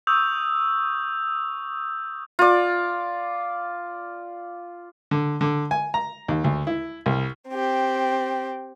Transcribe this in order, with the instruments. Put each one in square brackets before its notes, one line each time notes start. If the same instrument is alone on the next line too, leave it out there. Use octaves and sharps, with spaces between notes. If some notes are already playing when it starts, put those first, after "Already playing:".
[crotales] C#6 D#6 E6 G6 F7
[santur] F4 D5
[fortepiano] D3
D3
G#5
A#5
D#2
D2
E4
C2
[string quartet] C4 G4